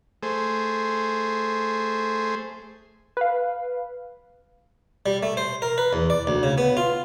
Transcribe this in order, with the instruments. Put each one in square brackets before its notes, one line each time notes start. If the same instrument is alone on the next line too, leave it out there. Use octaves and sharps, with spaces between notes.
[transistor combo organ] A3 G#4 C5
[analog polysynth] B4 F5
[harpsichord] G3
A3
C5
A#4
B4
E2
D5
D2
C#3
B3
F4